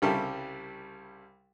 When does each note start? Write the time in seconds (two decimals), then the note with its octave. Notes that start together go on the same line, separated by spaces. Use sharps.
0.02 C2 C#3 G3 A4 A#4 E5